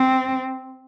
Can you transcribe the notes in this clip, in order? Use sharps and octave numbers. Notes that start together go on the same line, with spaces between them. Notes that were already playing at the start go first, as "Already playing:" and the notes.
Already playing: C4